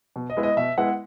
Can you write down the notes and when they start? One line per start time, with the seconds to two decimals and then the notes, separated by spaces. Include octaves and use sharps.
0.16 B2
0.30 D#5
0.37 G#3 B3 E4
0.43 D#5
0.57 B2 E5
0.77 G#3 B3 E4 F#5